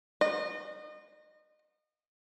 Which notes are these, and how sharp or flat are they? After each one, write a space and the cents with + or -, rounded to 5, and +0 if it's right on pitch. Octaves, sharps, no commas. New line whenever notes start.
D#5 -30